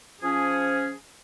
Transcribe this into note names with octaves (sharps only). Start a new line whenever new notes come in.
F3 C#4 G#4